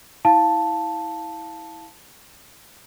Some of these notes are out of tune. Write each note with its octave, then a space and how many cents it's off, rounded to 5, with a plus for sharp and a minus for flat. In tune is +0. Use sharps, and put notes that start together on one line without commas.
E4 -20 F5 +0 A5 +0